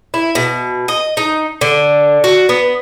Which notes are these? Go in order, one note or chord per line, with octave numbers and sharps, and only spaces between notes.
E4
B2
D#5
D#4
D3
F#4
B3